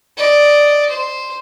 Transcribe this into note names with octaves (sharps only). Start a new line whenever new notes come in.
D5 D#5
C5